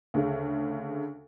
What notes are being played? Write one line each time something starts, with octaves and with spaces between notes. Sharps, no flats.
D2 C#3